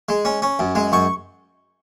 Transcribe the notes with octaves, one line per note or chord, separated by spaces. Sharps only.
G#3
C#4
C#4
F#2
G#3
F#2 C#6